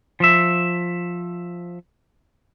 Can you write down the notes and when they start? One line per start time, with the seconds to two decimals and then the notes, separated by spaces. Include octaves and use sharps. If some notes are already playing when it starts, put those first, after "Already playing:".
0.20 F3 E5